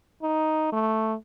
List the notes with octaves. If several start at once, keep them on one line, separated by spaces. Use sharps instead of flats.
D#4
A3